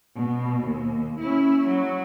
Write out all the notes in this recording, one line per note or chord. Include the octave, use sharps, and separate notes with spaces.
B2
D#2
C#4 E4
F#3